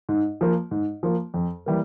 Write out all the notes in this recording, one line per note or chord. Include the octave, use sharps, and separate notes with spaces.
G#2
F3 A#3
G#2
F3 A#3
F2
E3 G3 A#3